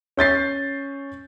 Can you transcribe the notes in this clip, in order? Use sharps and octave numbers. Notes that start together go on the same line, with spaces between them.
C#4 G6 A6 C7